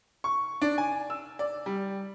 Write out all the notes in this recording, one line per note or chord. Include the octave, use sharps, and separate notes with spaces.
C#6
D4
G#5
E6
D5
G3